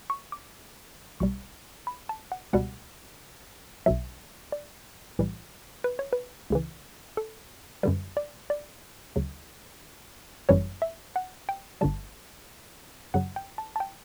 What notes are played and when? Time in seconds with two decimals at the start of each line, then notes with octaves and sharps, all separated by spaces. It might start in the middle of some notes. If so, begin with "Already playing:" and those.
0.10 C#6
0.32 D6
1.20 B1 B2 G3 C#6
1.87 B5
2.09 A5
2.32 F#5
2.53 C#2 B2 G3 F#5
3.86 B1 B2 F#3 E5
4.52 D5
5.19 B1 A2 E3 G3
5.84 B4
5.99 C#5
6.13 B4
6.50 C#2 C#3 E3
7.17 A4
7.83 F#2 D3 G3 B4
8.17 D5
8.50 D5
9.16 D2 C#3 F#3
10.49 G1 F#2 E3 G3 C#5
10.82 E5
11.16 F#5
11.49 G5
11.81 G1 G2 D3 G3 A5
13.14 F#2 C#3 F#3 F#5
13.36 G5
13.58 A5
13.76 A5
13.80 G5